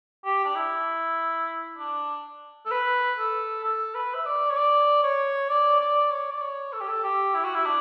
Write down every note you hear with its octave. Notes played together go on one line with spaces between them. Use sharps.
G4
D4
E4
D4
A4
B4
A4
A4
B4
E5
D5
C#5
D5
C#5
D5
D5
C#5
D5
C#5
A4
G4
A4
G4
E4
F#4
E4
D4